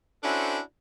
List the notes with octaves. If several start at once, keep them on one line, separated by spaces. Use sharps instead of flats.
C#4 D4 E4 F#4 A4 C5